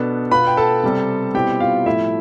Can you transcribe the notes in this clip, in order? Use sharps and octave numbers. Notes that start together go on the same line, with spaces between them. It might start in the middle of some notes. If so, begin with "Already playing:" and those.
Already playing: B2 B3 D4 A4
B2 B3 F4 B4 B5
G5
A4 A5
C3 G3 C4
B2 G3 C4 E4 G4 G5
F4 F5
A2 F3 A3 E4 E5